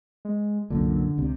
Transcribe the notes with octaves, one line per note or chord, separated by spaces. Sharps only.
G#3
C2 F#2 A#2 D3
C#2 C3